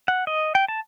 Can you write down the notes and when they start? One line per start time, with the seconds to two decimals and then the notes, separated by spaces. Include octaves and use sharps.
0.08 F#5
0.27 D#5
0.55 G5
0.68 A5